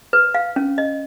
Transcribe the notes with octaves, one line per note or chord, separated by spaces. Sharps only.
B4
F5
C#4
D#5